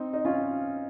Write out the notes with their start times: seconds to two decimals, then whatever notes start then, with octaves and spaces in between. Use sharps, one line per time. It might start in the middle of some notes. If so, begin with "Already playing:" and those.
Already playing: C4 D#4
0.13 D#4
0.25 C#4 F4